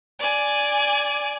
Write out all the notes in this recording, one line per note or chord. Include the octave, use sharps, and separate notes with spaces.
D5 G#5